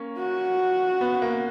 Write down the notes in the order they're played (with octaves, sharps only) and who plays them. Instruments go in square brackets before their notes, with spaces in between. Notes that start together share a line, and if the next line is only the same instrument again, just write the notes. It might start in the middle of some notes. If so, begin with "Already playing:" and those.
Already playing: [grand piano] A#3 C#4
[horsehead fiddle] F#4
[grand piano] B3
A#3